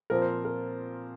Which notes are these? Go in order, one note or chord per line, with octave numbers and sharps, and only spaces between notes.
A#2 F3 C4 A#4
C5
A#4